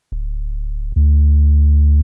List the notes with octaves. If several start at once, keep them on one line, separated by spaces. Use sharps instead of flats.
D1
D2